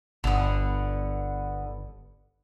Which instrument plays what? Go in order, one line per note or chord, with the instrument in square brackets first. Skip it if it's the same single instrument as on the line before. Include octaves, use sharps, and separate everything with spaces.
[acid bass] G1 [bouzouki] D3 B3